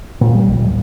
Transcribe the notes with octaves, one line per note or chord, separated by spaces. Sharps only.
A#2
G3
A#1
D1